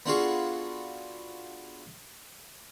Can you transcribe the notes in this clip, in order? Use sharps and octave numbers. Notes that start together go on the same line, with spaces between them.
B3 D4 F4 F#4 G#4 A4